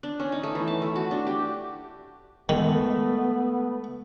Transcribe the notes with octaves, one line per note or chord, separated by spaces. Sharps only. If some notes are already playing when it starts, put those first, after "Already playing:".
D4
C#4
D#4
A3
E3
A5
A3
F#4
D4
G4
D#3 G#3 A3 B3